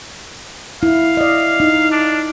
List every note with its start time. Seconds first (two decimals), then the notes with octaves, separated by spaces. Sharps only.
0.83 E4 F5
1.17 D5 D#5
1.60 D#4
1.92 D4